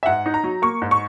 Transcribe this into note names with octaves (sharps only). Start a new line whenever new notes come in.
E5
G#2 F#5
D#4
A#5
F#3
A#3 C#6
G#2
C#6